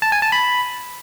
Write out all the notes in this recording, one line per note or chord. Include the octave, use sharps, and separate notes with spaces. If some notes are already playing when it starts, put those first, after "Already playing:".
A5
G#5
A5
B5